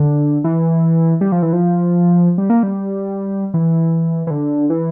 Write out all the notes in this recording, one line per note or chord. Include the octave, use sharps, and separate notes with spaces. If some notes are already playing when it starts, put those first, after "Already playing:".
Already playing: D3
E3
G3
F3
E3
F3
G3
A#3
G3
E3
E3
D3
E3